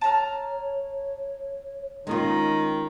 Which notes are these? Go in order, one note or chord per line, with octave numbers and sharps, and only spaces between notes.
C#5 A5 A#5 F6
D#3 G#3 C#4 F4